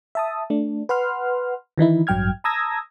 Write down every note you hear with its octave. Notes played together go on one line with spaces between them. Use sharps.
E5 A5 D#6
A3 D4
B4 F#5 C6 F6
D#3 E3 D#4 E4
A1 G2 F#3 G5 F6 G#6
A5 A#5 D#6 E6 G#6 A#6